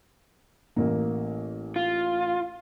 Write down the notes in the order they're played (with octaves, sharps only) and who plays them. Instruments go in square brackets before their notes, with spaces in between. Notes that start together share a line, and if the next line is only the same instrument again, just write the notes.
[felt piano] A1 A#3
[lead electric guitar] F4